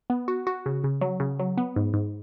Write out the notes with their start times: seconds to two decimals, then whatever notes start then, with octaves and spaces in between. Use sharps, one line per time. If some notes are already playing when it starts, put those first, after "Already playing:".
0.10 B3
0.28 F#4
0.47 F#4
0.66 C#3
0.84 C#3
1.01 F#3
1.20 C#3
1.40 F#3
1.58 B3
1.76 G#2
1.94 G#2